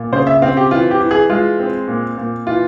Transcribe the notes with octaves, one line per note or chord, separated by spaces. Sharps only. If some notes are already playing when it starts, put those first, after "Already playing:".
Already playing: A#2
C#3 C5
E5
C4 F5
G4
E3 F4
G4
E3
G#4
G#3 F4
C4
A#2
A#2
E3 F4